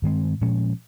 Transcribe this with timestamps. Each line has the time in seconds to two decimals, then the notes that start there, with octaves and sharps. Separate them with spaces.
0.02 G2 D#3 G#3 C4
0.41 A#2 F3 G#3 C#4